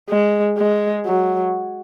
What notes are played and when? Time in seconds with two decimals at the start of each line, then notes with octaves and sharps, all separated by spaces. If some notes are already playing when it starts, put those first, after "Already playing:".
0.09 G#3
0.58 G#3
1.06 F#3